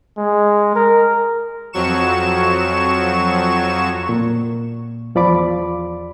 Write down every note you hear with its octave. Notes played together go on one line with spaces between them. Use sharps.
G#3
A#4
F2 F#3 C#6 E7
A#2
E2 F3 D5 B5 D6